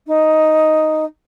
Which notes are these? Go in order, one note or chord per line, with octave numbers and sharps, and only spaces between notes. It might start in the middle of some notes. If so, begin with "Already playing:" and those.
D#4